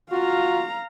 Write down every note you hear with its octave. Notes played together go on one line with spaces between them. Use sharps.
F4 F#4 F5 A#5